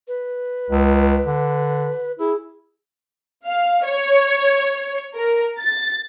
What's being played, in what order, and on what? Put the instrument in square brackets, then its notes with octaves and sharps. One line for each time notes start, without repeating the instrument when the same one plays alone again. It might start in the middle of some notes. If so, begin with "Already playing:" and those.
[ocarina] B4
[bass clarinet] C#2
D3
[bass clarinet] E4 [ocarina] G#4
[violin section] F5
C#5
A#4
A6